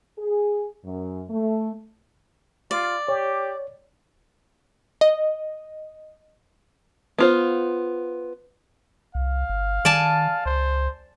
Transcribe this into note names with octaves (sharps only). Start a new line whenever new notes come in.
G#4
F#2
A3
F4 D5
G4 C#5
D#5
B3 F4 C5
C2 F5
G1
D#3 D5 G#5 A5
C#2 C5